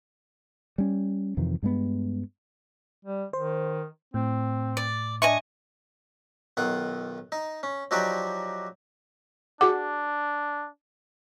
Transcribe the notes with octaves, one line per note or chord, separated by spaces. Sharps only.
G3 C#4
F2 C3 D#3 E3
G2 G#3 B3
G3
D#3 C5
A2 C4
D5
D4 D#5 E5 G#5 C#6
B1 D#3 F4 F#5
D#4
C#4
F3 F#3 D#4 F#4 G4 D5
D4 F#4 G#4 F#5 D6